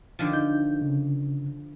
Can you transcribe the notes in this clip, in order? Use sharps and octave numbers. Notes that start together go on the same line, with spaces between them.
D3 D#3 F3
D#4 G6
C#3